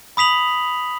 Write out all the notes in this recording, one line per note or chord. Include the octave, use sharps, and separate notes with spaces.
B5 D#6 B6 F7 F#7